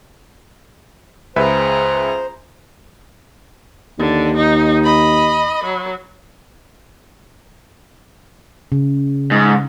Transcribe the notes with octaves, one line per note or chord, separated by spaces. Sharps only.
C#2 G#4 B4 C5 E5 A#5
D#2 D3
D#4
D#5 B5
F#3
C#3
G#2